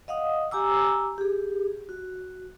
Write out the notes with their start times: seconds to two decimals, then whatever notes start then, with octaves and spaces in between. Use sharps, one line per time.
0.08 D#5 F5 F#5 D#6
0.51 G4 G#5 A#5 D6 E6
1.18 G4 G#4
1.89 F#4